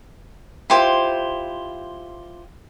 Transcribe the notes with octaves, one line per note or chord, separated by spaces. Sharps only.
E4 F4 G4 C5